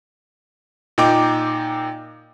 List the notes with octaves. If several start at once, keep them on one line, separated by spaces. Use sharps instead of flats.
A#2 D#4 G5 D6